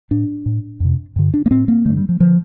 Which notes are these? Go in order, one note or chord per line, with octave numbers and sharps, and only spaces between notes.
A2 D4
A2
F2 C3
G2 D3
D4
A#3
A2 C4
A#3
G2 D3 A3
G3
F3
D3 F3